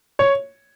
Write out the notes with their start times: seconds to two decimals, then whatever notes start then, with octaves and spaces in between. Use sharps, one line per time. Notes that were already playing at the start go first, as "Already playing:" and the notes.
0.19 C#5